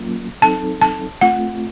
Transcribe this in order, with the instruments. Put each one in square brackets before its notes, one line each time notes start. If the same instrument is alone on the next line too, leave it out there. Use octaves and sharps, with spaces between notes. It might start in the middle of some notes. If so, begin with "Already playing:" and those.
Already playing: [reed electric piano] F#3 A#3 C#4 F4
[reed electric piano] F#3 C4 D#4 A4 [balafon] A5
[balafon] A5
[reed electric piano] A3 C4 F4 [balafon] F#5